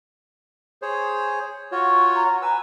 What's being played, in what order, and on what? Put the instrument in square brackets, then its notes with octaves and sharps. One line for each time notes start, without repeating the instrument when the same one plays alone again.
[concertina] G#4 C5 C#5
[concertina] F4 F#4 C#5 [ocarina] C#6
[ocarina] A#5
[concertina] B4 E6 [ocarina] G#5